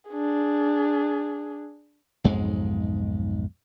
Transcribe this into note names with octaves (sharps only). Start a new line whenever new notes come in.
D4 G#4
B1 F2 G#2 G#3